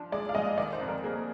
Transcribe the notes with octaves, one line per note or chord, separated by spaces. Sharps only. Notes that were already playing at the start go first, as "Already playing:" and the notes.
Already playing: F3 D4
G#3 D5
F5
G#2 D#5
D#3 D5
C5
F2
A#4
A#3 G#4